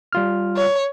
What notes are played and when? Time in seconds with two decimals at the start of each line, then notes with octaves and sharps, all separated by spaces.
0.12 G3 F4 F6
0.57 C#5